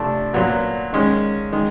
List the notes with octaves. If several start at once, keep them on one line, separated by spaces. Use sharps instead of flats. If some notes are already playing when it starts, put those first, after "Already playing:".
Already playing: C3 F3 A3 D4
A#2 F#3 B3
D#3 G#3 C#4
D#3 G#3